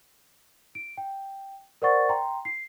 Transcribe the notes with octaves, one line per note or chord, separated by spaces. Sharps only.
D7
G5
A#4 C5 D5 F#5 C#6 A6
G5 A#5 C6
C7